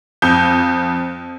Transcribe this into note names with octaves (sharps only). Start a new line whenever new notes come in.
F2 G6